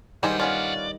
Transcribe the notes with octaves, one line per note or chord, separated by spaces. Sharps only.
G2 A#2 D#3 G3 G#4 C5 F#5
B3 C#4 F4 D5